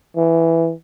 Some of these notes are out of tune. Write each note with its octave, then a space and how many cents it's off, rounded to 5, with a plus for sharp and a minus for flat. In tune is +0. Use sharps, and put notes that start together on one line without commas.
E3 +5